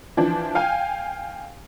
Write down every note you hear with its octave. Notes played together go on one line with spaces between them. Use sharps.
E3 F3 D4
F5 G5 G#5